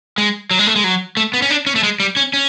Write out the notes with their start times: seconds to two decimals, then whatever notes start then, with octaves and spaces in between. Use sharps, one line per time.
0.18 G#3
0.51 F#3
0.59 G#3
0.67 A3
0.76 G#3
0.84 F#3
1.17 A3
1.34 B3
1.42 C#4
1.50 D4
1.66 C#4
1.76 A3
1.83 G#3
2.00 G3
2.16 C#4
2.34 C#4